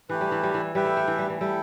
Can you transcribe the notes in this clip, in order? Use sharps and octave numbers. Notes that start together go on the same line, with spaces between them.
E3 A3 G4 B4
G3
E3
G3
E3
G3 G4 B4 E5 G5
A3
A3
E3
G3
E3
G3 E4 A4 G5